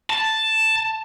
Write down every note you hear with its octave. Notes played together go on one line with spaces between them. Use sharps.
A5